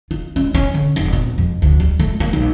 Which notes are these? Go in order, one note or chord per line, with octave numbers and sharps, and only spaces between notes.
F4
C#4
C#4
D3
F1
B2
F2
D2
G3
A3
A#3
B1